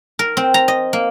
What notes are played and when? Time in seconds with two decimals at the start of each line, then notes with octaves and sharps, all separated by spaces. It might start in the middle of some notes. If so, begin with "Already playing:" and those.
0.19 A#4
0.37 C4
0.54 A#5
0.68 D#5
0.93 A#3